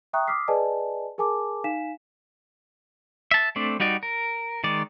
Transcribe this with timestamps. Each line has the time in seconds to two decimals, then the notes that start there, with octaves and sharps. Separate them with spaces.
0.13 E5 G5 A#5 C#6 D#6 F#6
0.28 D6 D#6 F6 B6 C7
0.48 G#4 B4 D5 D#5 G#5 A5
1.18 G#4 A#4 G#5 A5 D6
1.64 D#4 F5 G#5 B6 E7
3.31 E5 A5
3.56 A3 C4 D4
3.80 G3 D#4 F#4 D5
4.03 A#4
4.64 D#3 G#3 D5